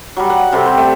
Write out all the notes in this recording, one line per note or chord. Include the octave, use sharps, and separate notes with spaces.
F#3 G3
F#5
C3 G3 C4 A4
C5
A3